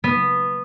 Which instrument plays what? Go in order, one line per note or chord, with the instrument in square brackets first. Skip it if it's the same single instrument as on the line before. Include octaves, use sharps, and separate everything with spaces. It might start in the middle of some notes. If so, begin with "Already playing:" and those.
[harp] B3